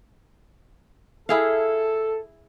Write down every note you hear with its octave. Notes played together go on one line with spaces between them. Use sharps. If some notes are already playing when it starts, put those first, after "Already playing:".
E4 G#4 A4 F5